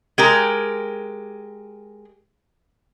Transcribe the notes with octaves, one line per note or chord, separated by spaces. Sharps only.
G#3 G4 A#4